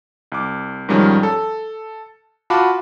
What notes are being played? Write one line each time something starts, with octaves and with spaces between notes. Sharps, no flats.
C2 D6
G#2 D#3 F3 G3 C#4
A4
F4 F#4 A5 B5 D6